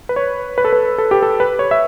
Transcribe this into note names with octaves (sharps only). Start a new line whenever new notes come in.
B4
C#5
B4
A4
B4
A4
G4
A4
B4
C#5
E5